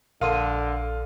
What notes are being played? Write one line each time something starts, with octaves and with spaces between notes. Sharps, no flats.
A#1 D3 A4 A#4 F5 C6 D#7